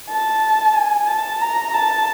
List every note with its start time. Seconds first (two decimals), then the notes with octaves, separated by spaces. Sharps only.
0.10 A5
0.75 G#5
1.08 A5
1.41 A#5
1.74 A5